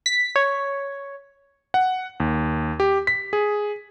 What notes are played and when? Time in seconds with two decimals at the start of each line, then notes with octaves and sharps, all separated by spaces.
0.06 B6
0.36 C#5
1.74 F#5
2.20 D#2
2.80 G4
3.07 B6
3.33 G#4